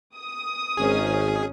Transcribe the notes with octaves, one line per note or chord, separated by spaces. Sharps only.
D#6
G#1 G#3 C#4 D#4 G#4